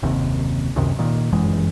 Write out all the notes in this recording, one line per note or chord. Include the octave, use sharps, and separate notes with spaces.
F#1 D#2 C3
C#2 F#2 C3 D#3
A#2 D#3
G1 F#2 E3 G#3